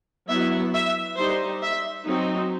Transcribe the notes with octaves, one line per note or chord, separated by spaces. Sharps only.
F#3 B3 E4 E5
E5
G3 D#4 C5
E5
F#3 C4 D#4